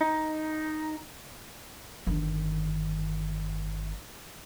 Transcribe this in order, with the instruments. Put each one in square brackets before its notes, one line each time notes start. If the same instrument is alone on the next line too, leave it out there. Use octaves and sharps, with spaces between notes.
[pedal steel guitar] D#4
[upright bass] G1 D#3